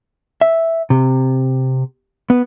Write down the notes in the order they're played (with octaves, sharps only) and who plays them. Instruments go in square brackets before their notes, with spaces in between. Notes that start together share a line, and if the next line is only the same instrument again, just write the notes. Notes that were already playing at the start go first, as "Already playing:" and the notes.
[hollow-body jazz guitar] E5
C3
B3